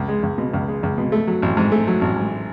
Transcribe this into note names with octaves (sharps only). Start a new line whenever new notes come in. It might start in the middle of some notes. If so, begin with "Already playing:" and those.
Already playing: C#2
G#3
C#2
B2
C#2
G#3
C#2
B2
A3
F#3
A1
G#2
A3
F#3
A1
G#2